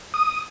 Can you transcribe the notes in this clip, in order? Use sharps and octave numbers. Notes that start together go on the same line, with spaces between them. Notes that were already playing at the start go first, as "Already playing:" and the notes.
D#6